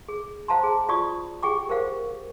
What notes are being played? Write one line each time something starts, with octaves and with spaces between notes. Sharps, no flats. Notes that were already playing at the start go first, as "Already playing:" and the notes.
G#4
C5 F5 F#5 A5 A#5 C6
G#4
F4 F#4 D5 C#6 D#6
G4 G#4 F#5 G5 C#6 D6
G4 A#4 C5 F5 F#5